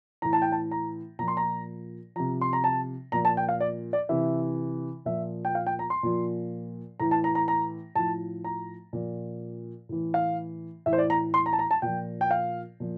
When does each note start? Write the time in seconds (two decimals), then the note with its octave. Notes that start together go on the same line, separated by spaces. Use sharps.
0.22 A2 E3 A#5
0.33 A5
0.42 G5
0.52 A5
0.71 A#5
1.19 A#2 F3 A#5
1.28 C6
1.37 A#5
2.16 C3 F3 A#5
2.41 C6
2.53 A#5
2.64 A5
3.12 A#2 F3 A#5
3.25 A5
3.37 G5
3.49 F5
3.60 D5
3.93 D5
4.09 C3 E3 E5
5.05 A#2 F3 E5
5.45 G5
5.55 F5
5.67 G5
5.79 A#5
5.90 C6
6.03 A#2 F3
7.00 A2 E3 A#5
7.11 A5
7.24 A#5
7.35 A#5
7.48 A#5
7.96 A2 F3 A5
8.44 A#5
8.93 A#2 F3
9.89 A2 E3
10.14 F5
10.86 A2 E3 E5
10.93 C5
10.98 D5
11.10 A#5
11.34 C6
11.46 A#5
11.53 A5
11.59 A#5
11.71 A5
11.82 A#2 F3 G5
12.21 G5
12.31 F5
12.80 A#2 F3